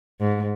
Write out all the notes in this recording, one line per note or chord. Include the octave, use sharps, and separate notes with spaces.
G#2